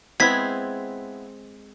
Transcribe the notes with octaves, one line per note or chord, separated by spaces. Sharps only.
G#3 B3 C4 E4 G#4 G#6 B6